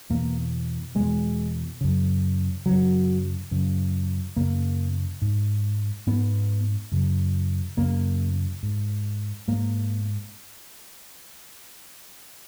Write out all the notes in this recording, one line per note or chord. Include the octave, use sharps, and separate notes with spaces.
E2 B2 A#3
E2 B2 G#3
F#2 C#3
F#2 C#3 F#3
F#2 C#3
F#2 C#3 A#3
G#2
G#2 B3
F#2 C#3
F#2 C#3 A#3
G#2
G#2 A#3